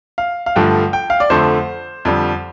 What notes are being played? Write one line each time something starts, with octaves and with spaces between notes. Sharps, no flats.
F5
F5
G2 D3 F3 A3 G5
G5
F5
D5
F2 D3 A3 C5
F2 D3 G3